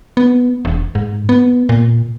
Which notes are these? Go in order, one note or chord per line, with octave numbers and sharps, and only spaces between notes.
B3
E1
G#2
B3
A#2